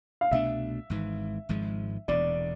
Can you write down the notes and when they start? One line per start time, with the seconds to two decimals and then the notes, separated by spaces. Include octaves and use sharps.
0.21 F5
0.31 C2 B2 A3 D4 E5
0.90 G#1 G#2 E3
1.49 G#1 G#2 F3 G#3
2.08 E1 E2 B2 D5